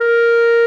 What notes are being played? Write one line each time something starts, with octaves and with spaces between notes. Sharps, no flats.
A#4